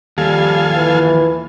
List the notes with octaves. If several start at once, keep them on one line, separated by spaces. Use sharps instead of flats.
D#2 F3 G3 A4 F5 G#5
E3